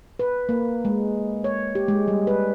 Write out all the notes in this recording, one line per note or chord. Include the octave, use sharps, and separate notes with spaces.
B4
A#3
G#3
C#5
G4
G#3
G3
B4